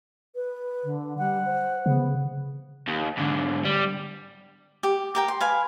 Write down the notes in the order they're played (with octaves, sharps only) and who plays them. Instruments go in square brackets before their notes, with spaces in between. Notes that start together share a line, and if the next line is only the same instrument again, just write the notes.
[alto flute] B4
[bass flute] D3
[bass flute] G3 [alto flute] F#5
[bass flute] C5
[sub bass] C#3 [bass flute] B3
[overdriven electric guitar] D#2
G#2 D3
G3
[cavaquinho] G4
G4 A#4 G5
C6
B4 F5 G#5